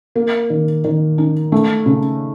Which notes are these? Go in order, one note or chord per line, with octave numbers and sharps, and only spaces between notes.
A#3
D#3
D#3
D#4
A3
C#3